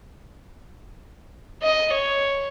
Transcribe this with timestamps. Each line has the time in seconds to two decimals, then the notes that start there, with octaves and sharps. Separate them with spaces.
1.63 D#5
1.94 C#5